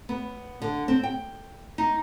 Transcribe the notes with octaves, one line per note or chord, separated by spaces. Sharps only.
B3
D3
C4
G5
D#4